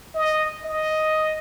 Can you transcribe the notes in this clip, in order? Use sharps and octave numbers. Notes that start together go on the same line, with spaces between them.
D#5
D#5